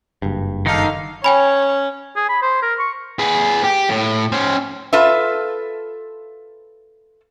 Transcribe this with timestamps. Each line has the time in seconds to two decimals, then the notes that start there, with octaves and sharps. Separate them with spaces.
0.22 F#1 G2
0.66 D3 D#3 D#4 F5
1.24 C#4 C#5 G5 G#5 B5
2.16 G#4
2.29 B5
2.42 C5
2.62 A#4
2.79 C#6
3.19 G#4 B4
3.64 G4
3.89 A2
4.32 C#4 C5
4.93 F4 A4 B4 E5